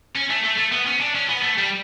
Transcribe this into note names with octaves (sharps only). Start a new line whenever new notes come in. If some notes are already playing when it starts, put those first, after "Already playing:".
C#4
A3
A3
A3
B3
C#4
D4
C#4
B3
A3
G3